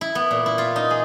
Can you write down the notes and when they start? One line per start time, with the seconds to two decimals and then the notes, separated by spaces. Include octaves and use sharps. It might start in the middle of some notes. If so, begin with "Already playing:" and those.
0.01 E4
0.15 B3
0.31 A#2
0.46 E4
0.58 F4
0.76 D#4
0.91 G#4